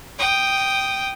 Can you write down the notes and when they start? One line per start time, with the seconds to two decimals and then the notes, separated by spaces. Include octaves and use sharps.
0.19 G5 D#6